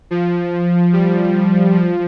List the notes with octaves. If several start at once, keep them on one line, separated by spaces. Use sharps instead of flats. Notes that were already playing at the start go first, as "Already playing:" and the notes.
F3
G3
F3